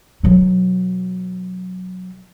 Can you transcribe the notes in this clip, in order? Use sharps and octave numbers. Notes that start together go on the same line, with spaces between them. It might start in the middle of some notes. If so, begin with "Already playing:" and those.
B2 F#3